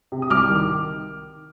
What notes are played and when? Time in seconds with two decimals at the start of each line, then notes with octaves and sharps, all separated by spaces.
0.12 C3
0.22 D#6
0.30 C2 D6 F6
0.49 D#3